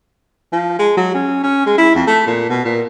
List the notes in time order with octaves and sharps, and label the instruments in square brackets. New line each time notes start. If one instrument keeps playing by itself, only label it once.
[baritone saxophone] F3
G#3
F#3
C#4
C#4
G#3
E4
F2
A3
A#2
B2
A#2